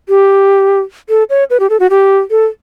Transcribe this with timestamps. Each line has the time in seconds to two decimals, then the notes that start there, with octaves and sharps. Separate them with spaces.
0.09 G4
1.09 A4
1.30 C#5
1.50 B4
1.60 G4
1.70 A4
1.80 F#4
1.90 G4
2.31 A4